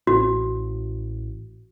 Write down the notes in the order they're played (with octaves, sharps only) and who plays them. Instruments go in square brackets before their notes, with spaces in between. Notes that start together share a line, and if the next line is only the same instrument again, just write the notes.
[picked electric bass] A1 [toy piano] F#4